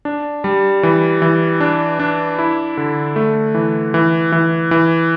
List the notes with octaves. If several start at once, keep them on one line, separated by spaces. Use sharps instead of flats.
D4
G3
E3
E3
D4
D4
E4
D3
A3
E3
E3
E3
E3